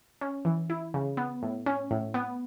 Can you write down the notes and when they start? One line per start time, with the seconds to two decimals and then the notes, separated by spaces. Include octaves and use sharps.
0.21 C#4
0.45 E3
0.70 E4
0.94 C#3
1.17 B3
1.43 A2
1.66 C#4
1.91 A2
2.14 B3